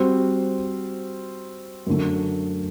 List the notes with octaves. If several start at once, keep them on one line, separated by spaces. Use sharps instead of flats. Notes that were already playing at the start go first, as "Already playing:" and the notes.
Already playing: G3 C4 F#4 C5
F#2 D3 A3